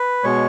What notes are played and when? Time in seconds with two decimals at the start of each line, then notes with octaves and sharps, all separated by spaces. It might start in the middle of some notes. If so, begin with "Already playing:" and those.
Already playing: B4
0.24 B2 G#3 C#5